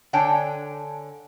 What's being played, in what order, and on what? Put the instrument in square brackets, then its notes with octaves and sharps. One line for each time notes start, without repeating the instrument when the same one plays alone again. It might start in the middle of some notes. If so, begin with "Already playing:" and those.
[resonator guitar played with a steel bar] D3 D4 C#5 G5 G#5